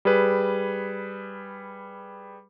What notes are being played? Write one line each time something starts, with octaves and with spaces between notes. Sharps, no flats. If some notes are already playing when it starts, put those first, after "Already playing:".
G3 G#4 B4